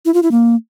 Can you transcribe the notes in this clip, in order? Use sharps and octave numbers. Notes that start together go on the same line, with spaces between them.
E4
F4
E4
A#3